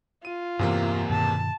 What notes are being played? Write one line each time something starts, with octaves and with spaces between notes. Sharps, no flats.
F4 D#7
E2 G2 C3 E3 A#3
G2 B2 D#3 A5